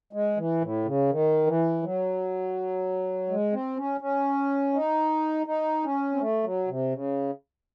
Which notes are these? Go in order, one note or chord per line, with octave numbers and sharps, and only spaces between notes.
G#3
E3
A2
C#3
D#3
E3
F#3
G#3
C4
C#4
C#4
D#4
D#4
C#4
C4
A3
F#3
C3
C#3